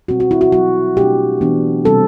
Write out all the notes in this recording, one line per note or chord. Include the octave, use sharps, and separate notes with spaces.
B2 G3 C4 F#4
F#4
E4
F#4
F#3 C4 F#4
B2 A3 D4 G4
E3 B3 D4
C3 G3 C4 A4